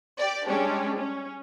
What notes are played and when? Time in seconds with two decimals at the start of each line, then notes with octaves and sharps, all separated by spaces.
0.18 G4 D5
0.47 G3 G#3 C#4 D4 G4
0.98 C#4